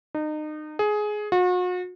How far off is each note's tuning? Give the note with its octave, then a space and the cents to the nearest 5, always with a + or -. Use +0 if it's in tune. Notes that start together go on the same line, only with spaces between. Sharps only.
D#4 -30
G#4 +15
F#4 -40